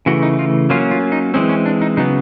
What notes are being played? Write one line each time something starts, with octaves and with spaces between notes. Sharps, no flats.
C#3 E3 A3 F#4
D#4
F4
F#3 A#3 C#4 F4
F4
D#4
E3 G#3 C4 C#4
C#4
D4
D#4
C#3 F#3 B3 D#4